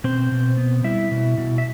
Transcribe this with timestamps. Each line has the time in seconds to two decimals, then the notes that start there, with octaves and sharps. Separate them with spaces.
0.04 B2 C4 C5
0.32 B2
0.57 B3
0.84 G3 E4 E5
1.11 B2
1.38 B2
1.58 E5